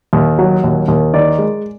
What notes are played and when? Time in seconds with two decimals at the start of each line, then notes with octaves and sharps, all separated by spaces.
0.13 D#2
0.39 F#3
0.64 D#2
0.88 D#2
1.13 D#3 D5
1.39 G#3